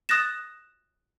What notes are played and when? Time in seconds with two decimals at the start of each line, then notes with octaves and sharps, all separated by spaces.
0.09 D#6 F#6 A6 A#6 E7